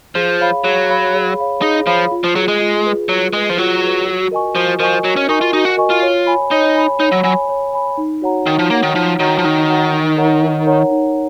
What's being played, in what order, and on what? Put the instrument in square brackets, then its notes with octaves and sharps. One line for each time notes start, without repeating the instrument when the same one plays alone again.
[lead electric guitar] F3 [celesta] G#4
[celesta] C#5 F5 B5
[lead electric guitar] F#3 [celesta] G#4
[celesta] C#5 F5 B5
G#4
C#5 F5 B5
[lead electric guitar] D#4 [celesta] G#4
[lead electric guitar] F3 [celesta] C#5 F5 B5
[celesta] F4
[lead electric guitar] F3
[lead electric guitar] F#3 [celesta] G#4
[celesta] B4
[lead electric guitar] G#3
[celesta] F4
G#4 B4
[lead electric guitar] F#3 [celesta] F4
[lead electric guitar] G#3 [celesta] G#4 B4
[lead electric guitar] F3
[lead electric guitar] F#3 [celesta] F4
[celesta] G#4 B4
F#4
A#4 D#5 G#5 C#6
[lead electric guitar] F3 [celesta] F#4
[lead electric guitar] F3 [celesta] A#4 D#5 G#5 C#6
[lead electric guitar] F#3 [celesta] F#4
[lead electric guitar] C#4
[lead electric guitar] D#4 [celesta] A#4 D#5 G#5 C#6
[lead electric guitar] F4
[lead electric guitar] D#4 [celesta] F#4
[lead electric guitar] F#4
[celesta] A#4 D#5 G#5 C#6
[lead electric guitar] F4
[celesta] C#5
G#5 B5
[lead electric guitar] D#4 [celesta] C#5
[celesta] G#5 B5
[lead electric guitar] D#4 [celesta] C#5
[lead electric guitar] F#3
[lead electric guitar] F#3 [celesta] G#5 B5
[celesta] C#5
G#5 B5
D#4
F#4 C#5 F#5 A#5
[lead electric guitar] D#3 [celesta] D#4
[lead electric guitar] F3
[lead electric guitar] A#3 [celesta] F#4 C#5 F#5 A#5
[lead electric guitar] D#3
[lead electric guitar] F3 [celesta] D#4
[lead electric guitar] D#3 [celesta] F#4 C#5 F#5 A#5
[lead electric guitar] F3
[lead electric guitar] D#3 [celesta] D#4
[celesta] F#4 C#5 F#5 A#5
D#4
A#4 C#5 F#5 A#5
D#4
A#4 C#5 F#5 A#5
D#4